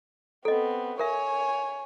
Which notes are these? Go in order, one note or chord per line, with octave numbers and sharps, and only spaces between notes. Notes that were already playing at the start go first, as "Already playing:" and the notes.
B3 C4 A4 D#5
A#4 C#5 E5 G#5